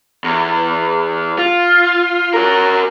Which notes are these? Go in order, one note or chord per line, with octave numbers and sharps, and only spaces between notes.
E2
F4
F#4 A#4